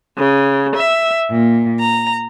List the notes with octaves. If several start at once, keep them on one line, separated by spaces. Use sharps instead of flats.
C#3
E5
A#2
A#5